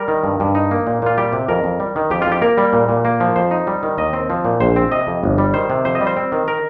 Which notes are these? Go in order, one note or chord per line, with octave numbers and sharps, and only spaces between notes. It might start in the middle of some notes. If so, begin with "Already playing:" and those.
Already playing: G3 A#4
D#3
G2
G2
D#4
A#3
A#2
A#2 F4
G3 G4
C3
F2 A#4
F2
G3
D#3
F2 G4
F4
F2
G4
A#3 A#4
G3
A#2
A#2
A#3
F3
F2 C5
D#4
G3
D#3
D#2 D#5
C4
F3
A#2
A#1 C5
C4
C3 D#5
F2
G1
G3
D#3 C5
C3
F2 C5
D#5
G3
C5
C4
D#3
A#4